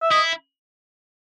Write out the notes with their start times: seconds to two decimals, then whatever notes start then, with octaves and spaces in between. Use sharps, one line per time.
0.02 E5
0.10 E4 D#5